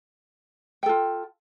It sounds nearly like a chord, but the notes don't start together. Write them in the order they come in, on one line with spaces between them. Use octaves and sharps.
G5 A4 F4